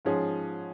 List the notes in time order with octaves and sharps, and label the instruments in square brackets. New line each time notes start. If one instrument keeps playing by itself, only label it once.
[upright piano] G#2 F3 C#4 G#4